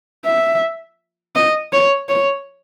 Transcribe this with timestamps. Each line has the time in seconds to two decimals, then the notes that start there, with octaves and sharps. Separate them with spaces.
0.25 E5
1.35 D#5
1.73 C#5
2.09 C#5